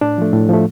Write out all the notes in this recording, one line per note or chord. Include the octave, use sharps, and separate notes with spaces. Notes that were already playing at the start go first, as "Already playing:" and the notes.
A2 D4
F3 A3
A2
F3 A3